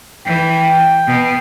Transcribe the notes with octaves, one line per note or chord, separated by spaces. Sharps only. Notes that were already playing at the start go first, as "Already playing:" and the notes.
E3 G5
B2